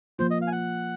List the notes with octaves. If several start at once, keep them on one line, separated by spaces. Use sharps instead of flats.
F3 A#3 F4 C5
D#5
F5
G#5
F#5